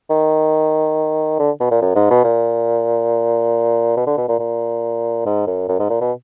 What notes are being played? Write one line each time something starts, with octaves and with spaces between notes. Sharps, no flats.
D#3
D3
B2
A#2
F#2
G#2
B2
A#2
B2
D3
B2
A#2
A#2
G#2
F#2
F#2
G#2
A#2
B2